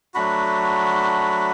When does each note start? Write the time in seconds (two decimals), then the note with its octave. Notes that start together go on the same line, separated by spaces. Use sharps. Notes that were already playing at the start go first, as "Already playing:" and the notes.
0.14 F#3 A3 D4 F#4 B5